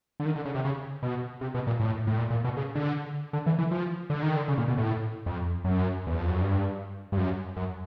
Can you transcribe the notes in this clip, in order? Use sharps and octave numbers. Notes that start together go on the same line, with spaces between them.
D3
D#3
D3
C#3
C3
C#3
B2
C3
B2
A#2
A2
A2
A#2
A#2
B2
C#3
D3
D3
E3
E3
F3
D3
D#3
D3
C#3
A#2
B2
A2
F2
F#2
E2
F2
F#2
G2
G2
F#2
F#2